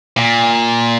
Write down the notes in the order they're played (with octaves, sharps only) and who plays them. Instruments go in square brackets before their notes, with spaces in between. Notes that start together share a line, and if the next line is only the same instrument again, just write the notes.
[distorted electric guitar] A#2